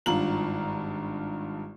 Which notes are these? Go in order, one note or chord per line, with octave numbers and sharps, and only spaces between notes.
G#1 G2 F4 A#5 F#7